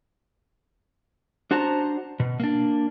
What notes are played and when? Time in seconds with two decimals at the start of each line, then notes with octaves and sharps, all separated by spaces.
1.51 D4 F#4 C5 A5 A#5
2.20 B2
2.40 A#3 D4